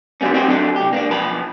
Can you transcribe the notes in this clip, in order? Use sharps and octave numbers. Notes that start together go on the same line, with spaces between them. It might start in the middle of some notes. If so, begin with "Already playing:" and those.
D3 F#3 G3 A#3 C#4
C4 D#4 F#4 G4 B4 C5
D3 F#3 D4 A4
C2 G4
A#3 C4 D4
B1 F3 A5 B5